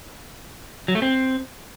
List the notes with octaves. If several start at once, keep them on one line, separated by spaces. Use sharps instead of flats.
F#3
A3
C4